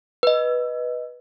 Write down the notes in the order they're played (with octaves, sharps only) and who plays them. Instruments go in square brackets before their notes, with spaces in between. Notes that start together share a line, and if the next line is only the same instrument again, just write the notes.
[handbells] B4 D#5